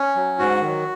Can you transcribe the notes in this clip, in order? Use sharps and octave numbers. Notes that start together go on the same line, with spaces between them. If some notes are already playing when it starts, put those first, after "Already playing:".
Already playing: C#4
F#3
G#2 F#4
D#3 F#3